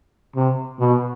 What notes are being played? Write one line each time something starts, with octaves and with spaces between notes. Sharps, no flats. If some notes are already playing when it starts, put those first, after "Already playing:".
C3
B2